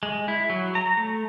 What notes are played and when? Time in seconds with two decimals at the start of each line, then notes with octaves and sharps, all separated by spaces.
0.03 G#3
0.28 E4
0.50 F#3
0.75 A#5
0.97 A3